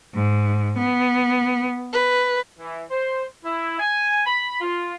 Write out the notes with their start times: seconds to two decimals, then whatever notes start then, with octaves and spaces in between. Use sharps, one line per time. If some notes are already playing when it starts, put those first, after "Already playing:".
0.14 G#2
0.77 B3
1.92 B4
2.59 E3
2.91 C5
3.44 E4
3.79 G#5
4.25 B5
4.61 F4